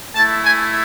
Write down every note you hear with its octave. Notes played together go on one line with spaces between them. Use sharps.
A3 E4 A5
G#5